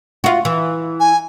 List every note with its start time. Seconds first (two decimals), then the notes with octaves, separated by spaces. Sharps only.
0.24 F4 F#4
0.45 E3
1.00 G#5